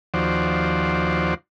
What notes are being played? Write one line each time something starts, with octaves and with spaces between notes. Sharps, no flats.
D#2 F3 F#4 C5 D5